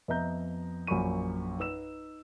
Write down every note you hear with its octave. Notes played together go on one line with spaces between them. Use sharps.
F2 B3 D#5 E5 A#5 G6
A#1 F#2 A#3 B5 C#6 D#7
D#4 B4 E6 E7